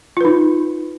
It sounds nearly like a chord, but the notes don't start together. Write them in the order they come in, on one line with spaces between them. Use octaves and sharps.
F4 B4 D#4